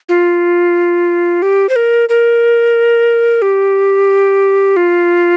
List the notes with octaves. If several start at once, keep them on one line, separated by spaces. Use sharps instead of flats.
F4
G4
C5
A#4
A#4
G4
F4